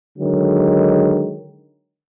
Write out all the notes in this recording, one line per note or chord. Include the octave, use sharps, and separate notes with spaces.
D3 D#3 F#3 G#3